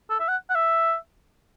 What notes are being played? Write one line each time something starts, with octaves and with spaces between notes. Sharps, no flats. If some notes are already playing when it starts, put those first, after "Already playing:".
A4
E5
F#5
F#5
E5